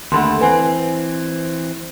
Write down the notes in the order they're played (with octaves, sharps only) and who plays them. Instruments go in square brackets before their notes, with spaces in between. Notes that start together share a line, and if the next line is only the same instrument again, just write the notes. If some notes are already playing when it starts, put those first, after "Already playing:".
[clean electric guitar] D#2 D3 A3 [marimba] F#5 B5 C6
[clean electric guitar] E3 C4 [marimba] B4 G#5